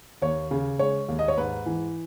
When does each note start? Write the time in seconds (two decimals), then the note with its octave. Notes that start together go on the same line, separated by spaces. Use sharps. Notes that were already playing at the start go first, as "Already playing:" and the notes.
0.22 D#2 C#5
0.51 C#3
0.79 G#3 C#5
1.08 D#2
1.19 D#5
1.28 C#5
1.38 G#2 B4
1.66 E3